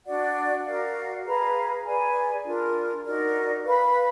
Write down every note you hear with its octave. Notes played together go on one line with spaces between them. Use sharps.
D4 F#4 D5 F#5
F#4 A#4 D5 F5
G#4 B4 F5 A#5
G#4 B4 D5 G#5
D4 F4 A#4
D#4 F#4 A#4 D5
B4 F5 B5